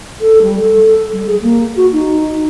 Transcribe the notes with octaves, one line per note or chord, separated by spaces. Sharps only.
A4
G3
A4
G3
G#4
A#3
F#4
D#4